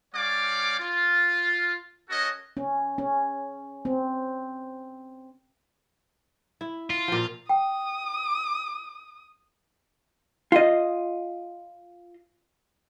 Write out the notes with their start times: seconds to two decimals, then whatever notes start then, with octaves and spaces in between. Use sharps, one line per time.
0.15 G3 C#4 C#5 D5 F5 D6
0.79 F4
2.09 C#4 F#4 A4 A#4 C#5 D#5
2.57 C#4
2.98 C#4
3.85 C4
6.61 E4
6.90 F4
7.08 A#2 F3
7.49 G5 D#6
10.52 F4 D#5